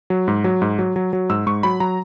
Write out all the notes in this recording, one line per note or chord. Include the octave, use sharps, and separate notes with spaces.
F#3
G#2
F#3
G#2
F#3
F#3
F#3
G#2 E6
G#2 C#6
F#3 B5
F#3 A#5